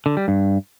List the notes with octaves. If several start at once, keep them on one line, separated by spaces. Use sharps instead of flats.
D3
G3
G2